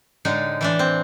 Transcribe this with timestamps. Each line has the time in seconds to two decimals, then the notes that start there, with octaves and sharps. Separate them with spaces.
0.25 A2 D3 G#3 D#4
0.61 E3 A3 D4
0.79 C4